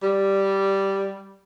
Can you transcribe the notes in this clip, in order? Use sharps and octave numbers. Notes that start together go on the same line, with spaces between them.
G3